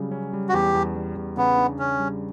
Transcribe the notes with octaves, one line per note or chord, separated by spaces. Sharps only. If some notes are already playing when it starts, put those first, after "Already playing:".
Already playing: C#3 F#3 G3
C#4
G3
F#4
E2 G4
E2
G3
E2
C#3 B3
D4
C#3 C#4
G3